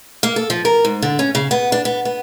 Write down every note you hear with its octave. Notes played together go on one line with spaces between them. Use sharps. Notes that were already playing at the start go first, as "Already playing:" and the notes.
A#3
A4
F3
A#4
G#2
D3
C#4
C#3
B3
D4
B3
B3